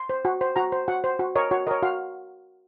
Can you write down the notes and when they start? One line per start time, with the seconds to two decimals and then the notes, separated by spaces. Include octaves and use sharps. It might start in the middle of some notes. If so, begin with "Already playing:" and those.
Already playing: C6
0.09 C5
0.25 F#4
0.41 C5
0.56 F#4 A#5
0.72 C5
0.88 F#4 F#5
1.04 C5
1.19 F#4
1.36 A#4 C#5 D#5
1.51 F#4 C#5
1.67 A#4 C#5 D#5
1.83 F#4 F5